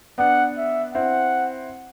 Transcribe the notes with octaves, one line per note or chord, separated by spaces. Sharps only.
B3 D4 F#5
E5
C4 E4 F#5